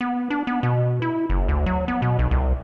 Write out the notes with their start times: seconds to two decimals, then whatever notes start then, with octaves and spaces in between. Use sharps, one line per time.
0.01 B3
0.30 D4
0.47 B3
0.63 B2
1.02 E4
1.30 F#1
1.48 D2
1.66 F#3
1.88 B3
2.02 B2
2.19 B1
2.31 C2